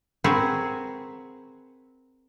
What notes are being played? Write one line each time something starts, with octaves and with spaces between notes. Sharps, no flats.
C4 F#4 G#4 A#4 B4